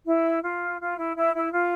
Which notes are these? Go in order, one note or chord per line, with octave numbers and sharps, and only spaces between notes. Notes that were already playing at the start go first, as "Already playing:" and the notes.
E4
F4
F4
E4
E4
E4
F4